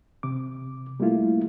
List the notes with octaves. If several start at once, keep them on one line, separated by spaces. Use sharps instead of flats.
C3 D6
G3 A3 A#3 E4 F4